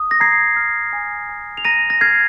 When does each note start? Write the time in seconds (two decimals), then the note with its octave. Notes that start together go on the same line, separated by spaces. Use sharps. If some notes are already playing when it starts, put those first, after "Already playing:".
Already playing: D#6
0.11 A#6
0.20 A#5 G#6 C7
0.56 F6
0.93 G#5
1.29 G#5
1.57 F7
1.65 A#5 A#6 D#7
1.90 A#6
2.01 F6 G#6 C7